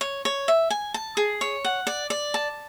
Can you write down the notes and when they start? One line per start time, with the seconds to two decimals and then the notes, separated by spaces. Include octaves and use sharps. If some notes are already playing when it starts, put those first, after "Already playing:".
0.01 C#5
0.25 C#5
0.48 E5
0.70 G#5
0.94 A5
1.17 G#4
1.41 C#5
1.65 F#5
1.87 D5
2.10 D5
2.34 A5